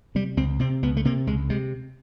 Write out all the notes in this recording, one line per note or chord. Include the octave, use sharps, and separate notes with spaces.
C3 G3
C#2 C4
C3 C4
C#2 B3
A3
C3 A#3
C#2 G#3
C3 G#3